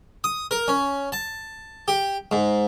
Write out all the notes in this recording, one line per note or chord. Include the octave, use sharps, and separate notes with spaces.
D#6
A#4
C#4
A5
G4
G#2